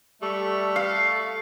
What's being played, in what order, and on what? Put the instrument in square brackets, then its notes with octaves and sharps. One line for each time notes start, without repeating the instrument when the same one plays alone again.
[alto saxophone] G3 [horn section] A3 [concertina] A4 C#6
[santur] F5